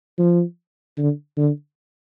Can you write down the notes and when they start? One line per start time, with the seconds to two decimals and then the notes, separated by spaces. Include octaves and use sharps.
0.18 F3
0.98 D3
1.38 D3